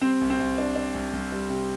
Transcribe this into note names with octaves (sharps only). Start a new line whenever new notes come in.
G3 C4
C2
C4
C2
D4
D4
C2
C2
G3
C3